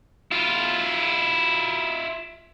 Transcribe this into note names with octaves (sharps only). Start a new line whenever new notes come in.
E4 F4